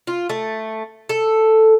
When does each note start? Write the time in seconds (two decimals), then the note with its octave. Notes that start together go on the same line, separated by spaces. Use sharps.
0.07 F4
0.29 A3
1.09 A4